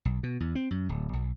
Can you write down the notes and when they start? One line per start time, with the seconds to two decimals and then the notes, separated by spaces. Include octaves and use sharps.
0.05 B1
0.23 B2
0.40 E2
0.55 C4
0.71 F#2
0.89 D1
1.13 B1